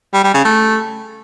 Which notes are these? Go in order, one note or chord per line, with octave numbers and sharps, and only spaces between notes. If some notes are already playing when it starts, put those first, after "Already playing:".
G3
G3
C#3
A3